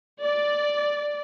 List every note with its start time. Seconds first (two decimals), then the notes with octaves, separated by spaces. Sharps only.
0.23 D5